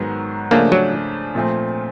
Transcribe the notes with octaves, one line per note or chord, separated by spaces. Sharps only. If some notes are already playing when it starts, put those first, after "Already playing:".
Already playing: G#2 D#3 F#3 B3
C#3 F3 A3 A#3 D4
F#3
A#2 F3 A3 C4